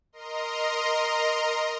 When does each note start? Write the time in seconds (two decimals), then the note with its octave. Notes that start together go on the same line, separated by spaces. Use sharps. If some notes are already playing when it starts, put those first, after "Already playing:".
0.12 A#4 D#5 A#5 C6